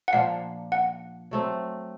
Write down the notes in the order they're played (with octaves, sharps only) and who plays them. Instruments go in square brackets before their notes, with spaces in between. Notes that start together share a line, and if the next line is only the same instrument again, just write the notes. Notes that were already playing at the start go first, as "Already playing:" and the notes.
[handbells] F#5
[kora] A#2 F3 A#3 D4 [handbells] F5
[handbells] F#5
[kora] F#3 A3 C4